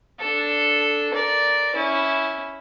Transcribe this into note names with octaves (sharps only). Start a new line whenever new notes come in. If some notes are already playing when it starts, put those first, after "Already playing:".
D4 A4
A#4 D5
C#4 E4